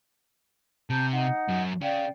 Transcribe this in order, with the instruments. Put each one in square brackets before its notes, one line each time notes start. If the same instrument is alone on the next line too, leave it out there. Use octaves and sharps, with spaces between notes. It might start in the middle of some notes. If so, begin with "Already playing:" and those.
[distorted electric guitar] C3 [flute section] A5 A#5 G6
[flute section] D#4 F#5
[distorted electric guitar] F#2
[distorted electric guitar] C#3 [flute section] D5 F5 G5